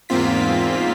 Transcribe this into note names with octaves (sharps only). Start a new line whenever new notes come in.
E2 G#2 A#3 C4 F4 B6